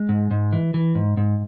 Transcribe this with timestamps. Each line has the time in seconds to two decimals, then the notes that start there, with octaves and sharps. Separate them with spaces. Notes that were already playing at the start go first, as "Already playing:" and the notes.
Already playing: G#3
0.09 G#2
0.31 G#2
0.53 E3
0.74 E3
0.95 G#2
1.17 G#2